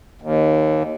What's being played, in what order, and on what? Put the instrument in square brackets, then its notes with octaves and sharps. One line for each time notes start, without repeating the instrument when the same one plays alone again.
[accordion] D#2